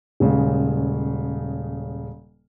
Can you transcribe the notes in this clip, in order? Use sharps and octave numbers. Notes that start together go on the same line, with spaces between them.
D#1 C#3 G#3